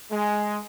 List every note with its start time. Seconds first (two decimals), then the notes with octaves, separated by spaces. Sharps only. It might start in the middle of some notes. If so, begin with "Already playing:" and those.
0.11 G#3